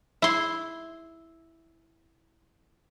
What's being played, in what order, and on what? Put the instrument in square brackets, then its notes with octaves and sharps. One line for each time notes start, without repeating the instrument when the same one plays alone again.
[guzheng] E4 C6